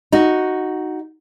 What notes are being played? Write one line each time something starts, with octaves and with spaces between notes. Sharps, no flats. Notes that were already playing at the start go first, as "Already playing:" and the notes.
D#4 F#4